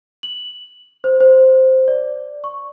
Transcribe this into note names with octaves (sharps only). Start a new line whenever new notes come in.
F#7
C5
C5
D5
C#6